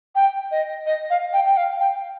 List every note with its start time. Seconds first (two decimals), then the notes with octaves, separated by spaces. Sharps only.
0.15 G5
0.51 D#5
0.86 D#5
1.10 F5
1.33 G5
1.45 G5
1.57 F5
1.80 G5